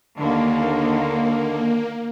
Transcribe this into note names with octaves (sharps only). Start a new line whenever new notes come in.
D#2 D3 A#3